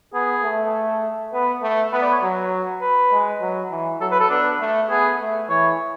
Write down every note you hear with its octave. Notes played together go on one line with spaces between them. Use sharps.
B3 G#4
A3
B3 B4
A3
B3 B4
D5
C#5
F#3
B4
G#3
F#3
E3
F#3 A4
B4
A4
B3 D4
A3
B3 G#4
A3
E3 C#5